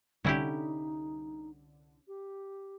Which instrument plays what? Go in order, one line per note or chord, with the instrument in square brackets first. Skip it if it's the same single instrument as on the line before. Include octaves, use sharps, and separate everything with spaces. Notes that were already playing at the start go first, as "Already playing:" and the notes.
[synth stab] C2 D3 [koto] C#4 E4 G4 [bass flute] D#4
[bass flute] G4